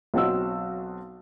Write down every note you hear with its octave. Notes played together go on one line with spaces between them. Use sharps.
B1 F#3 C4 F#4 D#5 E6